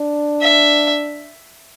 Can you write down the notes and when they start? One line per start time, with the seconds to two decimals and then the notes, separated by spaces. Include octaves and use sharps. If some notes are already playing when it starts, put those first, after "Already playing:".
Already playing: D4
0.42 E5